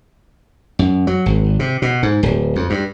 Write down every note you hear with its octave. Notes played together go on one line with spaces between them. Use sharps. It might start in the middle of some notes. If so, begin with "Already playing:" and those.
F#2
F#3
G#1
C3
B2
G#2
D1
F2
G2